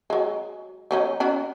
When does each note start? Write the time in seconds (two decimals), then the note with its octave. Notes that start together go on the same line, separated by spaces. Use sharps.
0.10 F#3 G#3
0.91 F#3 C#4 D#4
1.20 C#4 F#4 B5